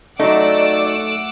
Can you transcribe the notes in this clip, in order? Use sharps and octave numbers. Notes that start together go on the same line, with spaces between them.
F#3 A3 D#4 D5 F#5 D6 E6